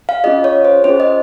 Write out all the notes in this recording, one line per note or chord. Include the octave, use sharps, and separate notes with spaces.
F5
C#4 F4 G#4 D#5
C#5
C5
C#4 F4 G#4 C5
D#5